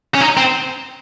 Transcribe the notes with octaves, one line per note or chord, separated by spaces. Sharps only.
C#4
D#4
C4